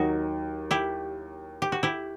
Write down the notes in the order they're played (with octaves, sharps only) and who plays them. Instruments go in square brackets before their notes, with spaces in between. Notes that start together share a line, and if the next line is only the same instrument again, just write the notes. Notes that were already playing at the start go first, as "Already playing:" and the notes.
Already playing: [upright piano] D#2 D#3 F#3 [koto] D#4 F#4
[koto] E4 G4
G4
F#4
E4 G4